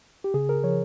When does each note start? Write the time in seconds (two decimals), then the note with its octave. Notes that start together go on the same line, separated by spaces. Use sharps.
0.24 G4
0.34 C#3 G#4
0.49 A#4
0.64 F3 C#5